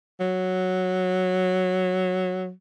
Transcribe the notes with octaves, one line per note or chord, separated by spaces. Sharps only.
F#3